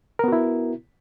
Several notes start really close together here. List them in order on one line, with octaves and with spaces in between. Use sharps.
A#4 B3 F#4 E4